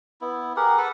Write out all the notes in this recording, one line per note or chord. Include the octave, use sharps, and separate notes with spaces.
B3 E4
G4 G#4 A#4 F#5
A4 B4 F#5